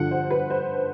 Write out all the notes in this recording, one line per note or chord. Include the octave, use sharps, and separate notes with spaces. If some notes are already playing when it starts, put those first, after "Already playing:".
Already playing: G2 D3 F3 F#5
C5
B4
C5